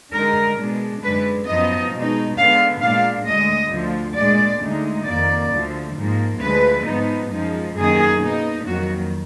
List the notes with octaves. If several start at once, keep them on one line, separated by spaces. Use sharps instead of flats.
D3 G#3 D#4 A#4
B2 G#3 D4
F#2 D3 G#3 D4 B4
F#2 F3 B3 D#4 D#5
B2 G#3 D#4
D3 G#3 B3 D4 F5
A#2 G#3 D4 F5
D2 D3 G#3 D#5
D2 D3 F3
A#2 G#3 D4 D5
D2 D3 G#3 D#4
F2 D#3 A#3 D5
D2 D3 F3
G#2 F3 A#3
D2 D3 F3 G#3 B4
G#2 F3 B3 D#4
F#2 F3 G#3 D#4
F#2 D#3 A#3 D#4 G#4
B2 A#3 D#4
F2 D#3 F#3 A#3 F#4